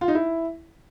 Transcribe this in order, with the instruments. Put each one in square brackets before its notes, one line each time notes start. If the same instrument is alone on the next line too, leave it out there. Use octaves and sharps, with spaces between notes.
[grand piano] F4
D#4
E4